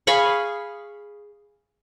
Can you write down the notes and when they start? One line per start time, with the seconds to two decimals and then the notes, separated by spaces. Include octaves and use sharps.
0.07 G#4 F5 B5 C#6